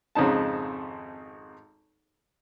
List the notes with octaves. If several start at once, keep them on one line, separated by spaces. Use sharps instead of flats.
G#1 F2 C#3 D#4 A5